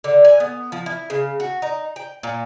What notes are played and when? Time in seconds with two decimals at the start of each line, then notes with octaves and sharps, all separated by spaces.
0.04 D3
0.25 G#5
0.40 B3
0.72 F3
0.86 E4
1.10 C#3
1.40 F#4
1.62 D#4
1.96 G5
2.23 A#2